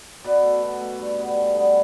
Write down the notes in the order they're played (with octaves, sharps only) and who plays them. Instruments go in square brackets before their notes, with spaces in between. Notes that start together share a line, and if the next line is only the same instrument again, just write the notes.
[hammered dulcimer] B2 B4 D5
A3
B2
A3
G2
D3 G3 B3
G2
D3 G3 B3